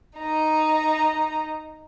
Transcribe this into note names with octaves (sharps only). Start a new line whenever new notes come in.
D#4 A#5